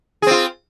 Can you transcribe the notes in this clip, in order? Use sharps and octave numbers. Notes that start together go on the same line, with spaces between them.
C4 F4 G#4